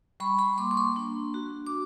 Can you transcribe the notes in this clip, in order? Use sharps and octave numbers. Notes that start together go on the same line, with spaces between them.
G3 B5 C#6
B5 C#6
A#3 C6 D6
C#6
C6 D6
D4
F#4
D6